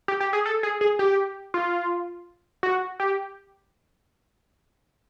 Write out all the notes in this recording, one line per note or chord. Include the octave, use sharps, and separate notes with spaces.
G4
G4
G#4
A4
G#4
G#4
G4
F4
F#4
G4